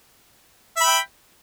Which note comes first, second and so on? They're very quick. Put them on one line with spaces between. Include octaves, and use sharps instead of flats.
E5 B5 G5